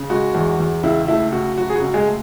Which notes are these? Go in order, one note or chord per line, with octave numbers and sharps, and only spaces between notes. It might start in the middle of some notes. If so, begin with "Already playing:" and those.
Already playing: C#3
G#3 F#4
E2
E2
C#2 E4
A3 E4
C#3 F#4
F#3 F#4
G#4
F#4
C#2
G#3 G#4
A3